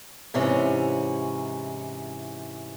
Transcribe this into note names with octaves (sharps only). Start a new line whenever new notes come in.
G#2 C3 E3 C#4